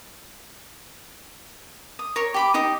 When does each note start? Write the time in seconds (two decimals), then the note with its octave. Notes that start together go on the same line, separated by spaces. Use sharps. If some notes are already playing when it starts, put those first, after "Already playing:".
1.99 D#6
2.16 A#4 C#5
2.34 G4 B5 D6
2.54 D#4 G4 D#6